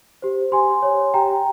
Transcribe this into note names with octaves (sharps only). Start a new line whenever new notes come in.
G4 C5
G4 G#5 C6
C#5
G4 G5 A#5